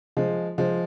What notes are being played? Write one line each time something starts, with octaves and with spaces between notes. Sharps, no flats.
F3 G#3
F3 G#3